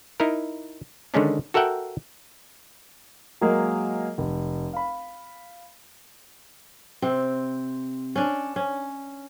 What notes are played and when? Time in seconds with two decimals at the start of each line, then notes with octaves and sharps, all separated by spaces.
0.20 D#4 E4 A#4
1.14 D3 D#3 G#3 C#4 D4
1.54 F#4 A4 A#4 E5 F#5 G5
3.41 F#3 G#3 A#3 G#4 A#4 D#5
4.18 F1
4.74 F5 B5
7.02 C3 C4
8.16 C#4 D4
8.56 C#4